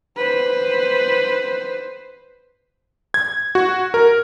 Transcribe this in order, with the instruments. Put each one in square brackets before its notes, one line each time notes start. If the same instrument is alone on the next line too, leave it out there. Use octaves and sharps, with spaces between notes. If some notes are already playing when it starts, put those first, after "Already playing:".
[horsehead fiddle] B4 C5
[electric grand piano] G#6
F#4
A#4